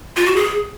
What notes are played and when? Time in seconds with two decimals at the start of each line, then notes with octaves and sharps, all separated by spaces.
0.16 F4
0.26 F#4
0.36 G#4